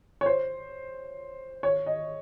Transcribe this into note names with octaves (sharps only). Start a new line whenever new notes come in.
C#5
C5
C#5
D#5